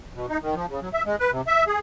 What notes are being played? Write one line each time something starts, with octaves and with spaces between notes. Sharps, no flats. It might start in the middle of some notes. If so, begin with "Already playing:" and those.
B2
D#4
D#3
F3
C#3
F#3
E5
G#3
B4
C3
E5
G#4